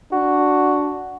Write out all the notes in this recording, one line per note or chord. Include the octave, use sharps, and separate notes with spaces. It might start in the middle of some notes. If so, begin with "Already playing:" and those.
D4 F#4